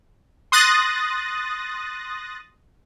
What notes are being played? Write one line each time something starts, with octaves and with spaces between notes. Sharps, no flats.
C6 D#6 F#6 A6 A#6